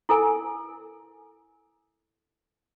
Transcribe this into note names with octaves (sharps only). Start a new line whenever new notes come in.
E4 A4 A#4 G#5